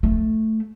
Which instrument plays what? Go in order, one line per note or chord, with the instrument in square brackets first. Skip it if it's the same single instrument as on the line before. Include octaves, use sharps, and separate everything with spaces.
[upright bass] A3